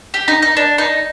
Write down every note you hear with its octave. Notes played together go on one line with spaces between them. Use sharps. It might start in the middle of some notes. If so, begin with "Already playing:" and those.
G4
D#4
D#4
D4
D#4